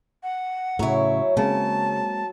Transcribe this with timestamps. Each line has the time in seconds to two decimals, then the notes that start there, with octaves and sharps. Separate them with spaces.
0.23 F#5
0.79 A2 C#3 F#3 E4 C#5
1.37 C#3 G#3 A#3 C4 A5